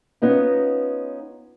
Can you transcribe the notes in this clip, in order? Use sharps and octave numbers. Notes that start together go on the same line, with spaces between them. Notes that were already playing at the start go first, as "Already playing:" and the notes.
B3 C#4 D#4 F4